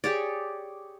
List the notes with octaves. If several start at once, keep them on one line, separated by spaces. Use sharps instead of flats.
G4 G#4 C#5 D5